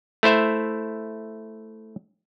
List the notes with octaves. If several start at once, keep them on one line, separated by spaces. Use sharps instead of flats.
A3 E4 C5 E5